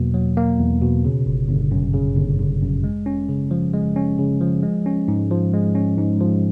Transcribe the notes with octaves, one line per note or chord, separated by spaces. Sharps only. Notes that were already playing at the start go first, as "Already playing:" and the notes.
Already playing: E2 B2 F#3 A#3
F#3
A#3
E2
B2
C#3
G1
G1
F#2
C#3
G1
G1
F#2
G#3
C#4
C#3
F3
G#3
C#4
C#3
F3
G#3
C#4
G#2
F3
G#3
C#4
G#2
F3